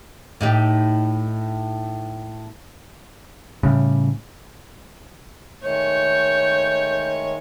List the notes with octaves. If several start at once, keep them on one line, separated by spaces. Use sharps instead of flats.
A2 D#4 G4
A2 C#3 G3
D#3 G#3 A3 C#5 G6